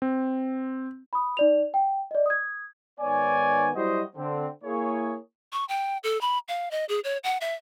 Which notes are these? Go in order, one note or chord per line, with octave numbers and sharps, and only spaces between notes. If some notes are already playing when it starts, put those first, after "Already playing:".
C4
B5 D#6
D#4 D5 F7
G5
D5 D#5
D#6 G#6
G#2 D#3 B3 C#5 D5 G#5
F#3 G3 E4 F#4 C5 D#5
D3 C4
A#3 E4 G#4 C#5
C#6
G5
A4
B5
F5
D#5
G#4
C#5
F#5
E5